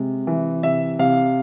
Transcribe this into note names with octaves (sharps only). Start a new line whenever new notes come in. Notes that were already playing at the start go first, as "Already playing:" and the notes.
Already playing: C3 G#3
E3
C3 E5
C3 F5